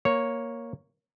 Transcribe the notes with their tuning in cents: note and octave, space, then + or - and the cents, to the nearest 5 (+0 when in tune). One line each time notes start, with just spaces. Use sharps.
A#3 +5 C#5 +0